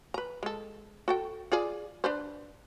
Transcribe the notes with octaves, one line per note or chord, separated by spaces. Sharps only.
B4 A#5
G#3 A4
F#4 A4 G5
F4 G#4 D5
D4 B4 C5